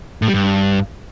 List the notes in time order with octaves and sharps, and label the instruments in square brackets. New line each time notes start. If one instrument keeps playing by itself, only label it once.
[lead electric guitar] A2
G3
G2